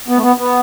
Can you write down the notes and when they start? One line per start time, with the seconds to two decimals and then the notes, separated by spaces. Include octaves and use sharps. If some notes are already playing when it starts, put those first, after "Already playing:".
0.08 B3
0.16 A3
0.22 B3
0.38 B3